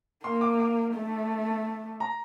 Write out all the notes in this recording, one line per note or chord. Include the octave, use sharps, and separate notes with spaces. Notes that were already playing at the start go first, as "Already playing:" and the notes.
A#3 C6
D6
D6
A3
A#5